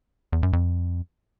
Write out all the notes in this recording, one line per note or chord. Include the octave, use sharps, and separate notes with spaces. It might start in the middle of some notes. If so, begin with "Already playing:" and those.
E2
F#2
F2